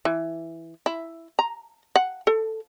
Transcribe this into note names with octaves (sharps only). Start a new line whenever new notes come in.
E3
E4
A#5
F#5
A4